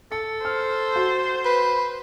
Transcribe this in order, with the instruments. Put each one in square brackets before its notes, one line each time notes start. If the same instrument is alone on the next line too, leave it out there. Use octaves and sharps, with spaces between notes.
[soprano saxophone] A4 [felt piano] C#7
[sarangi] C5 [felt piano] F6
[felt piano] F#4
[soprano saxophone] B4